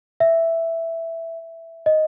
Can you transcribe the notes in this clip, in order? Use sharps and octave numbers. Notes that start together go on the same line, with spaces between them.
E5
D#5